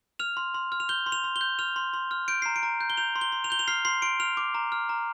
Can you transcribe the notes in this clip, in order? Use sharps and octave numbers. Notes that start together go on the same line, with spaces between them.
F6 F7
C6
C6
F6
F7
G6 G7
C6
F7
C6
G7
G6
F6 F7
C6
C6
F6
G6 D7
A#5 C7
D7
A#5
G6
G7
G6 F7
C6
G7
C6
F7
G6 G7
F7
F6 C7
C6 C7
C6 D7
F6 F7
D6
A#5
F6
A#5